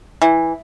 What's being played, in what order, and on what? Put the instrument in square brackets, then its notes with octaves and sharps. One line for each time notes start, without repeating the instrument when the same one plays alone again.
[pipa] E3